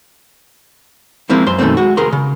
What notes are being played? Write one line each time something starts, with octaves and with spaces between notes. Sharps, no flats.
F3 G#3 A#3 C4 E4
F#2 C5 C6
F#2 B2 D#3 A3 C4
G#3 F#4
C#2 G#4 A#4 C6
C#3